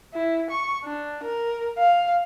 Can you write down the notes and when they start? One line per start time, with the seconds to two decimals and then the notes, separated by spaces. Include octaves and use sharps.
0.14 E4
0.50 C#6
0.84 D4
1.24 A#4
1.78 F5